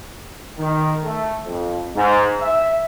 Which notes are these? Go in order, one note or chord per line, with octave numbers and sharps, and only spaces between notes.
D#3
A3
F2
G#2
E5